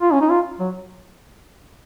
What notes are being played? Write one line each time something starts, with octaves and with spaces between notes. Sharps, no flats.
F4
C#4
D#4
F4
F#3